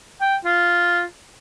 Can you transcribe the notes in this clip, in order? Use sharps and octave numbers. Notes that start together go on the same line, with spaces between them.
G5
F4